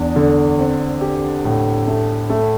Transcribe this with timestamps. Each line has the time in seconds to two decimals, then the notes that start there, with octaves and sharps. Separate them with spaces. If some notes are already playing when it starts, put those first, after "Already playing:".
Already playing: E2 D4
0.16 D3
0.58 C4
1.01 G4
1.45 A2
1.87 A3
2.30 A3